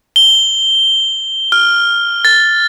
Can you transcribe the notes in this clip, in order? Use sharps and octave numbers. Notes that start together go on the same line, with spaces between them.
G7
F6
A6